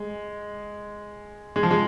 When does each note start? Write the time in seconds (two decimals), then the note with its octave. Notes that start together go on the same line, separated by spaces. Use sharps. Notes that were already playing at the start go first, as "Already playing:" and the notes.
Already playing: G#3
1.56 G#3
1.63 F3
1.71 G#3